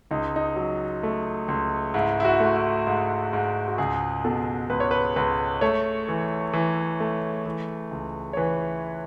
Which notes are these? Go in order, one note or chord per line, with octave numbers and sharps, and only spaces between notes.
C#2 D#4
D#4
F#3
A3
C#2
G#2 E4
E4
F#4
A3
E4
G#2
G#2
F#4
C#2 G#4
B2 A4
C#2 B4
C#5
B4
C#2 B4
A3 C#5
E3
E3
A3
E3
C#2
C#5
E3 B4